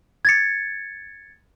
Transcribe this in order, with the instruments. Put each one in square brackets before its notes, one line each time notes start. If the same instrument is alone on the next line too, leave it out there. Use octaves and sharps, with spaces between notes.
[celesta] G#6 A6 C#7